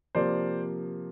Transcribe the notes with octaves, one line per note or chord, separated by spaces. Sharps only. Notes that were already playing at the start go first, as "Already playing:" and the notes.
C3 F3 A#3 C5 D5